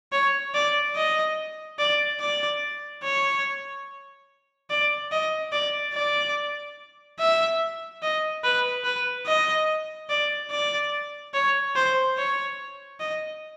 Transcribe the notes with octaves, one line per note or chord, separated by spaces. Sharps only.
C#5
D5
D#5
D5
D5
C#5
D5
D#5
D5
D5
E5
D#5
B4
B4
D#5
D5
D5
C#5
C5
C#5
D#5